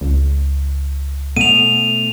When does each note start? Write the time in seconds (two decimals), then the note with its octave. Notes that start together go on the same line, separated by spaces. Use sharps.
0.01 C#2
1.37 B2 A3 D#7 F7